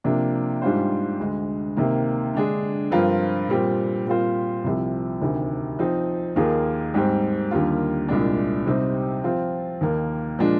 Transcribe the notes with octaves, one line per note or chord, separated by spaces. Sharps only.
C3 F3 A#3 D4
G#2 G3 D4 F4 C5
D2 D3 G#3
C3 D#3 A#3
D3 G#3 D4 G#4
G2 F3 C4 F4 A#4
A#2 G3 C4
A#2 G3 C4 F4 C5
C2 C3 F3
D2 C3 D#3
F3 C4 D#4
D#2 D#3 A#3 F4 G#4
G#2 G3 C4
D#2 D3 G3 A#3 F4
C2 A#2 G#3 D4
C3 G3 C4 D#4
F3 C4 F4
D#2 D#3 A#3
A#2 F3 G#3 D4